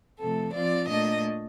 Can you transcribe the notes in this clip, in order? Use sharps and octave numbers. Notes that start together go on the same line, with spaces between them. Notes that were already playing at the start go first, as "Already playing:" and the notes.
C3 F3 A3 A4
F3 C4 F4 D5
A#2 A3 D4 D#5